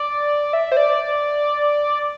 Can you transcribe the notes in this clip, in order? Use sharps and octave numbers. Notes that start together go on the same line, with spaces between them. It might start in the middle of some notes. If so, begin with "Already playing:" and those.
Already playing: D5
E5
C5
D5